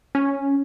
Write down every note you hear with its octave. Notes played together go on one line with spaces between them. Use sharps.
C#4